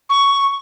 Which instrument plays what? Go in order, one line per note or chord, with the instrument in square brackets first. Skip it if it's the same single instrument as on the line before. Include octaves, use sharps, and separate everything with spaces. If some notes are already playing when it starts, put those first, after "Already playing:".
[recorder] C#6